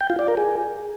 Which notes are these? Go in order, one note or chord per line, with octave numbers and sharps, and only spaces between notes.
G5
F4
D5
A#4
G#4